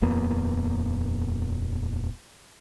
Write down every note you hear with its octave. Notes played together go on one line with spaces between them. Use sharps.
D#1 F2 A#3 B3